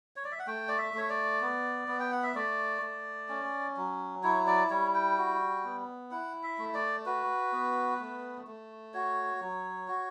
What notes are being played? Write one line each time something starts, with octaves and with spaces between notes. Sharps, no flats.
C#5
D5
E5
F#5
A3 G5
D5
E5
A3 C#5
D5
B3
B3
G5
F#5
E5
A3 D5
A3
C#4
F#3
E4 C#5
D5
G3 C#5
G5
F#4
B3
E4 F#5
E5
A3
D5
F#4 B4
B3
A3
A3
F#4 C#5
F#3
F#4